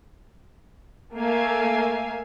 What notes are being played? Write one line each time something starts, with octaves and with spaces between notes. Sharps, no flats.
A3 A#3 E5 F5 G#5